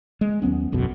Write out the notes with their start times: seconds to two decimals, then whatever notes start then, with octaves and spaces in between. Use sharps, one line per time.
0.21 G#3
0.42 D#2 F#3 B3 C#4
0.72 E1 B1 F#2 B2